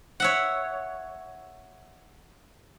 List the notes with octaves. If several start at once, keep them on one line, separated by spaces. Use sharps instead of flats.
C#5 E5 F#5